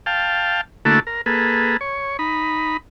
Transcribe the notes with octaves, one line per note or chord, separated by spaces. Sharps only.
F5 G5 A5
D3 A3 A#3 E4 F#4 A4
A#4
A#3 G#4 A4 B4
C#5
D#4 B5